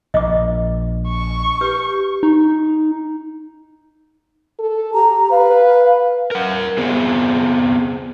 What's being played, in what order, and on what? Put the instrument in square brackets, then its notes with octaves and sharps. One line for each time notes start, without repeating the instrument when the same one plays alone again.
[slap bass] A#1 [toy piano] D#5 D6
[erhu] C#6
[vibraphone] G4 [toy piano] B4
[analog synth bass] D#4
[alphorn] A4
[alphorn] G4 [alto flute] A#5
[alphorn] B4 [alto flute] F5
[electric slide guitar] A#4 F#5
B3 C4 G#4